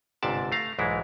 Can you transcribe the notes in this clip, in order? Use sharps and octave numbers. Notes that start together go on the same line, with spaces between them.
G1 G#2 C3 D5 A5
A3 F5 A#5
B1 G#2 E3 G#3 E4